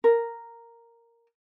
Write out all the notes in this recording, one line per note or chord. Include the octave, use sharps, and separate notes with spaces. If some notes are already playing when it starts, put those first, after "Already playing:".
A#4